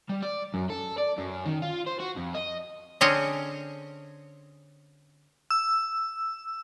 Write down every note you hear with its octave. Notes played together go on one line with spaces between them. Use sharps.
G3
D5
F#2
A4
D5
F#2
D#3
F4
C5
F#4
F2
D#5
D3 C4 C#4 G#4 C#5 D#5
E6